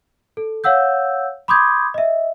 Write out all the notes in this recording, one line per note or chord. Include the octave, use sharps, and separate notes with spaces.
A4
C#5 F5 F#5 E6 G6
B5 C6 D6 D#6 G6 G#6
D#5 E5